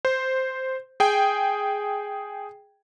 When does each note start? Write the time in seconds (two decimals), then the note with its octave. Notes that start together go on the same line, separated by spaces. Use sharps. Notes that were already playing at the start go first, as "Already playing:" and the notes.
0.05 C5
1.00 G#4 G5